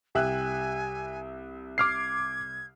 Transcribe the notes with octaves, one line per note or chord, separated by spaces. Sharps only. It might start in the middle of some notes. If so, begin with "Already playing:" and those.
C2 G4 E5 G#5 F#6
D6 F6 G#6 C7